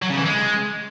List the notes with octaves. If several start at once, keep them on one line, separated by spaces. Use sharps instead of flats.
F#3
C#3
E3
G#3